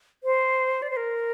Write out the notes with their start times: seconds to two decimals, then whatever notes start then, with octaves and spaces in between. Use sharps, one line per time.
0.24 C5
0.82 D5
0.90 C5
0.97 A#4